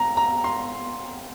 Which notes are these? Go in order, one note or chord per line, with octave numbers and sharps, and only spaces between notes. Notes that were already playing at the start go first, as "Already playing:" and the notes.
Already playing: A#5
A#5
C6